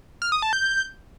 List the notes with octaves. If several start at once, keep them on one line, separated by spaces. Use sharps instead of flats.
F6
D#6
A5
G6